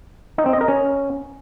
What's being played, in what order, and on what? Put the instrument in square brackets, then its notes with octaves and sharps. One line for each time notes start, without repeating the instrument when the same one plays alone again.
[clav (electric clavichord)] D#4
C4
D#5
A#4
C#4